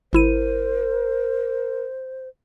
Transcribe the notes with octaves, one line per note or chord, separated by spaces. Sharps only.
G#1 E4 A#4 C5 D#7